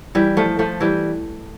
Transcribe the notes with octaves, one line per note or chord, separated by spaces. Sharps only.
E3 G3
F3 A3
F3 A3
E3 G3